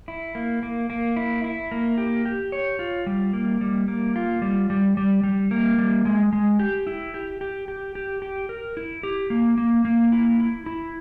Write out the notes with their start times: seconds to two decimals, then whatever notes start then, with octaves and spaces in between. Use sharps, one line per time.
0.08 E4
0.35 A#3
0.63 A#3
0.90 A#3
1.17 E4
1.44 E4
1.71 A#3
1.98 G4
2.26 G4
2.52 C#5
2.79 F4
3.06 G3
3.33 A#3
3.61 G3
3.88 A#3
4.16 F4
4.42 G3
4.70 G3
4.97 G3
5.24 G3
5.51 A#3
5.78 G3
6.05 G#3
6.33 G#3
6.59 G4
6.87 E4
7.14 G4
7.41 G4
7.68 G4
7.95 G4
8.22 G4
8.49 A#4
8.77 E4
9.03 G4
9.30 A#3
9.58 A#3
9.85 A#3
10.12 E4
10.40 E4
10.66 E4